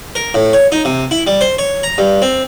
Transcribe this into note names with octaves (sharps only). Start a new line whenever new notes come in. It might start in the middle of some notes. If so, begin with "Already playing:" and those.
A#4
A2
C#5
D#4
C3
E4
G3
C5
C#5
A#5
G2
C4